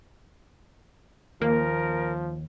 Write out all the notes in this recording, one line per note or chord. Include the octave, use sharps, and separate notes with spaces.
D#2 F3 A#3 A#4